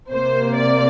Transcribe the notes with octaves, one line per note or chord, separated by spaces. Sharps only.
C3 A#3 C5
D5